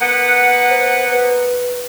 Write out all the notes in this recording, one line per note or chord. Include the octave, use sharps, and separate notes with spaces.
A#3 B3 F#5
C5
B4